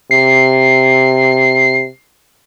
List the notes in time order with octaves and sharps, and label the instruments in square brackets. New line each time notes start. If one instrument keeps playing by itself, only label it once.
[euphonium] C3 [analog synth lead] C7